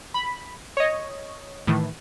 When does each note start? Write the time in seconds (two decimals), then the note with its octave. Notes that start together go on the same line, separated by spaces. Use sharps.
0.14 B5
0.77 C#5 D#5
1.67 A2 D#3 E3